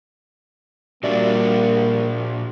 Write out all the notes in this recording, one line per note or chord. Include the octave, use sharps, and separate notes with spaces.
A#2 G3 A#3 D4 F4 F#4 D5 E5